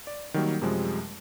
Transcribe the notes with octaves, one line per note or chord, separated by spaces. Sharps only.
D5
D#3 F#3 G3 A#3 G4 A#4
F#2 C3 F3 G3 G#3